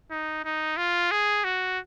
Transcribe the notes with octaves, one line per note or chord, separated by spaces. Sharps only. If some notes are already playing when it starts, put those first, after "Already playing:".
D#4
D#4
F4
G#4
F#4